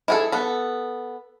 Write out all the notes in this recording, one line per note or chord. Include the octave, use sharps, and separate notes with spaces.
E4 G#4 A4
B3 A4